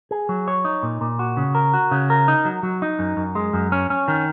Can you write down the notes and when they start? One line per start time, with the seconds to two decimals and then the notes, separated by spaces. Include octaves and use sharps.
0.11 G#4
0.29 F#3
0.48 C#5
0.65 D#4
0.83 A#2
1.01 A#2
1.19 F#4
1.37 C#3
1.55 A#4
1.74 F#4
1.91 C#3
2.10 A#4
2.28 D#4
2.45 F#3
2.63 F#3
2.82 D#4
2.99 F#2
3.17 F#2
3.35 G#3
3.54 F#2
3.72 C#4
3.90 C#4
4.08 D#3